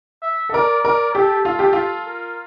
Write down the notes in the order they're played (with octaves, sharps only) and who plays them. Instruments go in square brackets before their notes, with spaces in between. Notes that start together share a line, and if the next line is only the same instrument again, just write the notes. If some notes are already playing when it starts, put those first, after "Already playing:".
[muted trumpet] E5
[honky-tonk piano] A4
[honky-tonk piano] A#4 [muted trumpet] D5
[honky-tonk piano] A#4 [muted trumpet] D5
[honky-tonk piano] G4 [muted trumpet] A4
[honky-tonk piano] F4 [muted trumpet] A4
[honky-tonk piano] G4
F4
[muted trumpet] A#4